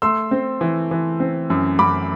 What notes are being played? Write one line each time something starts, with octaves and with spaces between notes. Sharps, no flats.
A3 C6 E6
C4
E3
E3
C4
F#2
F#2 B5 D6